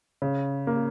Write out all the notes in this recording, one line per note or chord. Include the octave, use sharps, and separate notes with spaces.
C#3
A#3